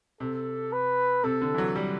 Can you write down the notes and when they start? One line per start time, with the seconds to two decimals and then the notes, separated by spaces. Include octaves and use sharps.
0.20 C3 A4
0.73 B4
1.24 C3 A4
1.41 D3
1.54 E3
1.58 F#3
1.75 G3